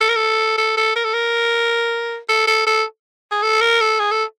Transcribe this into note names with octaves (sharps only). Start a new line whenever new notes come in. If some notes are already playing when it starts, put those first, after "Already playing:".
A4
A#4
A4
A4
A4
A#4
A4
A#4
A4
A4
A4
G#4
A4
A#4
A4
G#4
A4